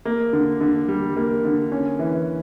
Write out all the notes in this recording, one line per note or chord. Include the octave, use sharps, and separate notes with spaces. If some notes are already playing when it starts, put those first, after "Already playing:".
A#3
D3
D3
G3
A#3
D3
C#4
E3